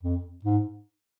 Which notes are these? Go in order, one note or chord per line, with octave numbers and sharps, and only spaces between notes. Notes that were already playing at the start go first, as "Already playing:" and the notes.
F2
G#2